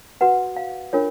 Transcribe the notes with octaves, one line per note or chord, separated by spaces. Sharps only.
F#4 B4 F#5
F5
D4 F4 A#4 C#5